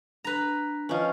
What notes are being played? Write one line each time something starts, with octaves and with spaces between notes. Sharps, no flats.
D4 B4 A#5
F3 C#4 B4 D#5